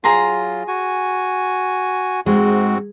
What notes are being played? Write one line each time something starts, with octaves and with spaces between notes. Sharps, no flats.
F#3 F4 G#4 A#5 C6
F#4 G#5
G#2 G#3 C4 F#4